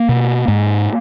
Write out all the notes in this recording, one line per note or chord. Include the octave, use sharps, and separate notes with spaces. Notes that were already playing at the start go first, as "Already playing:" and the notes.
Already playing: A#3
B2
G#2